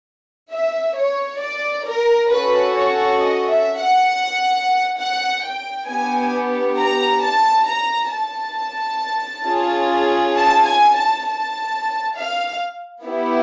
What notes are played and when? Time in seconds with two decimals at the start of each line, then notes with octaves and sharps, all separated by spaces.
0.51 E5
0.95 C#5
1.40 D5
1.86 A#4
2.30 C#4 F#4 A4 B4
2.75 C#5
3.19 D#5
3.50 E5
3.79 F#5
4.98 F#5
5.43 G5
5.88 B3 D4 G4 G#5
6.78 A#5
7.21 A5
7.67 A#5
8.11 A5
9.45 C#4 F4 G#4
10.36 A5
10.65 G#5
10.94 A5
11.25 A5
12.15 F5
13.04 B3 E4 G4